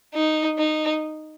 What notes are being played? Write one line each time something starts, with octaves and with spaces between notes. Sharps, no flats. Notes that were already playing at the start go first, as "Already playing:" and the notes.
D#4
D#4